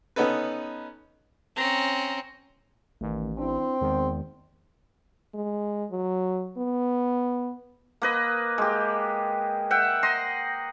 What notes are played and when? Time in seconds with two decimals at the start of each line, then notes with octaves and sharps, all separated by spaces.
0.16 B3 C#4 D#4 A4 B4
1.56 C4 C#4 A#5
3.01 A1 D#3 A3
3.38 C4 D4 E4
3.81 E2 D#3 G#3
5.34 G#3
5.91 F#3
6.57 B3
8.02 A#3 B4 D#5
8.58 G#3 G4
9.71 E5 F#5 G5
10.03 D#5 A#5 C6